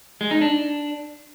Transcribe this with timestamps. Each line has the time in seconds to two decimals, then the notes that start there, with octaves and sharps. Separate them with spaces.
0.21 G#3
0.31 D#4
0.41 D4